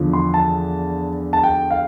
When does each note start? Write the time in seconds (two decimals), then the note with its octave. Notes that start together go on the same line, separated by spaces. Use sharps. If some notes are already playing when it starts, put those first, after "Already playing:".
Already playing: E2 D3 F3
0.13 C6
0.34 A5
1.33 A5
1.43 G5
1.71 F5